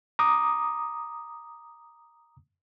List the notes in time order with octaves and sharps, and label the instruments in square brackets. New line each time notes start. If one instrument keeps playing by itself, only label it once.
[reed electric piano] A#5 D6 D#6